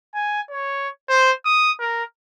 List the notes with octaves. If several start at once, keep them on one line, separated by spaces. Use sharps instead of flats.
G#5
C#5
C5
D#6
A#4